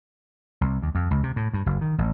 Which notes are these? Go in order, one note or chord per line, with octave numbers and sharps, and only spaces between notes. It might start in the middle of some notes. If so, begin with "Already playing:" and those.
C2
D#2
F2
C#2
C3
A2
G2
F#1
D#3
A1